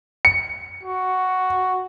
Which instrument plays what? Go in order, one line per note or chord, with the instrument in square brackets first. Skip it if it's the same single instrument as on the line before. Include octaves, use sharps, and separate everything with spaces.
[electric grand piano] C#7
[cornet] F#4